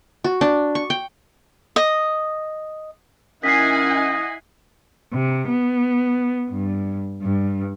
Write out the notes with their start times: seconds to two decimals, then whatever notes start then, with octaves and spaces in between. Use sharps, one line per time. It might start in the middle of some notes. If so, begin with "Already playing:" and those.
0.24 F#4
0.41 D4
0.75 C#6
0.90 G5
1.76 D#5
3.44 D#3 C#4 E4 D#5 F#5 G#5 B6 C7
5.12 C3
5.49 B3
6.50 G2
7.22 G2